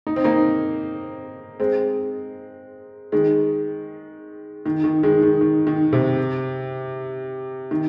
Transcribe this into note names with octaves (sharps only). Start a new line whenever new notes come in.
D#4
C4
A#3 D#4
G#3 C4
D#3 G#3
D#3
D#3
D#3 G#3
D#3
D#3
D#3
C3
D#3